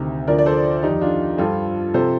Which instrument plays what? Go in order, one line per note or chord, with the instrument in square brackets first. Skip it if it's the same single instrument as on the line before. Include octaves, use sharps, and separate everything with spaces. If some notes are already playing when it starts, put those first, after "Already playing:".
Already playing: [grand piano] D2 C3 D#3
D2 D3 F3 A#4 D5
D5
A4 C5
F2 D#3 D#4 G4
D4 F4
G2 F3 F4 A4
C3 F3 A4 C5